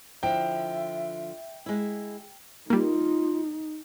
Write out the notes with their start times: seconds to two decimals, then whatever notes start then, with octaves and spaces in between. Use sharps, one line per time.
0.23 D3 F3 E4 E5 G5
1.66 G#3 E4
2.70 G3 A#3 D#4 F4